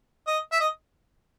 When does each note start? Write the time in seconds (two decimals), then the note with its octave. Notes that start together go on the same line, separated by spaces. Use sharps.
0.27 D#5
0.52 E5
0.60 D#5